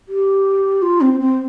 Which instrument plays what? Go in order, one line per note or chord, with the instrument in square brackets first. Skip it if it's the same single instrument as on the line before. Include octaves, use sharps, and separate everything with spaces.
[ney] G4
F4
C4
C4